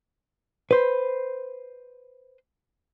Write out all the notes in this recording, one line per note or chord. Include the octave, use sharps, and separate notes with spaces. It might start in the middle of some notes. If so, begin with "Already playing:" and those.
B4 C5